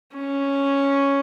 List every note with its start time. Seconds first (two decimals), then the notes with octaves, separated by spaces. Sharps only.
0.14 C#4